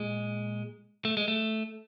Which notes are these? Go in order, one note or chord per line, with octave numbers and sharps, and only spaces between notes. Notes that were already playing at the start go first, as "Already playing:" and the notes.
Already playing: A#2 G#3
A3
G#3
A3